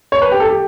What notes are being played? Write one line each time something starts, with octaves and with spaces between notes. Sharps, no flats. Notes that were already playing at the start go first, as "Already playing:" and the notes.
C#5
B4
G4
A4
G4